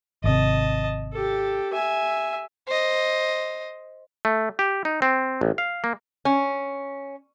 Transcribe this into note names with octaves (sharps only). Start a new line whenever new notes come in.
G#1 C3 D#5 A5
G4 A4
E5 G#5
C5 D#5
A3
G4
D#4
C4
A1
F5
A#3
C#4